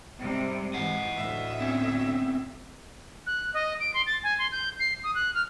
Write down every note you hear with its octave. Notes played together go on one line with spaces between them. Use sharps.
G#2 C3 G3
G#2 E3 D#5 F#5
D2 A2 E5
C4 C#4
F#6
D#5
D7
C6
A6
G#5
C6
G6
C7
D#6
F#6
F6